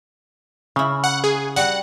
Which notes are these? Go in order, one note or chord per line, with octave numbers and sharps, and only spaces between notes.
C#3 C#4 E4
F#5
G#4
G3 F#4 F#5